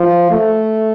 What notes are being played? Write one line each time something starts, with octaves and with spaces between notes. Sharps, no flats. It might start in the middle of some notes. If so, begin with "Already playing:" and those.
Already playing: F3
A3